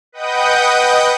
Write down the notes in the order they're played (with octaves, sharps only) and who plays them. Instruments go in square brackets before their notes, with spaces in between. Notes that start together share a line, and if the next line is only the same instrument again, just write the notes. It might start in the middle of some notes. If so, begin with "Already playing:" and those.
[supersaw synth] B4 D#5 F#5 G5 D#6 G6